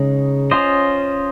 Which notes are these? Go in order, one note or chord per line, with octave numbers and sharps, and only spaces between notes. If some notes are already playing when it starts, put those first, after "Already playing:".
Already playing: C#3 G#3 D#4
C#4 F4 C5 D#5